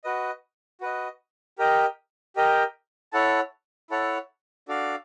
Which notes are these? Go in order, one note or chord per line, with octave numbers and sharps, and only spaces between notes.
F#4 B4 D#5
F#4 B4 D#5
G4 A#4 D#5 G5
G4 A#4 D#5 G5
E4 A4 C#5 F#5 A5
E4 A4 C#5 F#5 A5
D4 F#4 A4 D5 F5